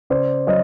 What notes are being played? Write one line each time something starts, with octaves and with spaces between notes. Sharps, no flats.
C#3 C5 D5
F#3 C#5 D#5